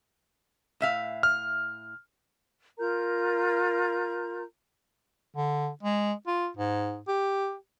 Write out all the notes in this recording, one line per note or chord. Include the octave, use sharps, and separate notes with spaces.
A2 E5 F5
F6
F4 A#4 A#5 G6
D3
G#3
F4
G#2
G4